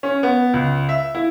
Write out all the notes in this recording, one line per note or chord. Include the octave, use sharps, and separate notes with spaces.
C#4
B3
C#2
E5
E4